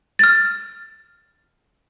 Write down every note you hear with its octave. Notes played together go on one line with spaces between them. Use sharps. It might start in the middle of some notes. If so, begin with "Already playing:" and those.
F6 A6